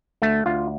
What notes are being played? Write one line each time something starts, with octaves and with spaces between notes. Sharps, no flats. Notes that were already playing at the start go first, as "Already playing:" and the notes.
D2 A3
D2 F4